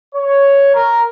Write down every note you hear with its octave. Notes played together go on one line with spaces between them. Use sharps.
C#5
A#4